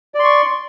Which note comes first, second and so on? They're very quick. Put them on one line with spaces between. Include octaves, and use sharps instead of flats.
D5 C6 C#6